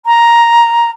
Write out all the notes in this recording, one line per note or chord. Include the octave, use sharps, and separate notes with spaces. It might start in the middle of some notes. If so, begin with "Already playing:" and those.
A#5